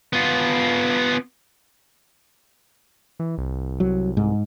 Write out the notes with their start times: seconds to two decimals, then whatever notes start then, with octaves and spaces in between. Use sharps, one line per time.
0.13 B3 F4
3.19 E3
3.38 C2
3.80 F#3
4.17 G#2